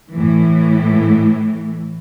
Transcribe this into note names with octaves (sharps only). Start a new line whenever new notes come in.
A2 E3